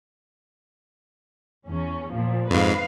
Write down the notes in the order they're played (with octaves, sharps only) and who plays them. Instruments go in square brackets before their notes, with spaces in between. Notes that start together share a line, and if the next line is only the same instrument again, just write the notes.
[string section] E2 C#4
A#2 F3
[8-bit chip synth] F2 G#2 [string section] B4 F5